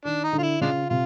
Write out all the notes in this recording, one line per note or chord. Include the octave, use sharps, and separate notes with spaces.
D#3 D4
D#4
D3
F4
E4
C#3 G#3 D4 F4
C3 F4